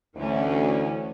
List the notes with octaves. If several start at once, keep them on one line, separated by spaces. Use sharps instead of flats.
D2 E3 A3 C#4